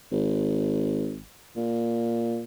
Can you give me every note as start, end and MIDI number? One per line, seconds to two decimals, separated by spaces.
0.12 1.20 32
1.56 2.43 46